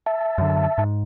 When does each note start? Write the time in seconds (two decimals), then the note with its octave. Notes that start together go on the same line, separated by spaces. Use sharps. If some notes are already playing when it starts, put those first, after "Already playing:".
0.06 E5 A5
0.38 F#2 D3
0.78 G#2